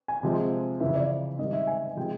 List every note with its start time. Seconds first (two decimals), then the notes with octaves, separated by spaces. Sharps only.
0.08 G#5
0.23 C3 F3 G#3
0.80 F2 C#3 E3 E5
0.95 D5
1.39 G#2 D#3 G3 D#5
1.53 E5
1.67 G#5
1.97 C3 F3 G#3 G5